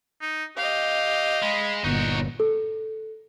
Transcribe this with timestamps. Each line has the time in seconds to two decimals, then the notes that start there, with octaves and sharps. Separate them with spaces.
0.21 D#4
0.57 G4 D#5 F5
1.42 G#3 B5
1.84 G1 A#2 D#4 F#4 C#5
2.40 A4